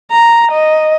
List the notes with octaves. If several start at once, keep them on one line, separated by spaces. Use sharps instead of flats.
A#5
D#5